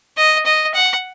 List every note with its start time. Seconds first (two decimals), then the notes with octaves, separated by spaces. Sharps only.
0.17 D#5
0.46 D#5
0.74 F#5